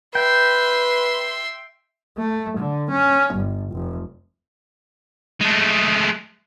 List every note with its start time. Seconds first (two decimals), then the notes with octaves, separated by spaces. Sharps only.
0.15 B4 E5 G5 C6
2.17 A3
2.57 D3
2.91 C#4
3.35 G1
3.73 F1
5.41 G#3 A3